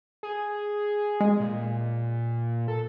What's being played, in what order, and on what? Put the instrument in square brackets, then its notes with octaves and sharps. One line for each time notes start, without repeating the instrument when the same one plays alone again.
[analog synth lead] G#4
[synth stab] G#3
[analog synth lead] A#2
A4